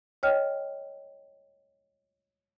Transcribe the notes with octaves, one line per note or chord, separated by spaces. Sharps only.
C#5 D#5 G5 F6